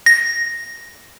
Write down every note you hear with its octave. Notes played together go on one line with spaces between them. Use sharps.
A#6